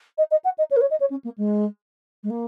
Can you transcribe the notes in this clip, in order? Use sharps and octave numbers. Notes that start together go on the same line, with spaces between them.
D#5
D#5
F#5
D#5
C#5
A#4
C#5
D#5
C#5
C#4
A#3
G#3
G#3
A#3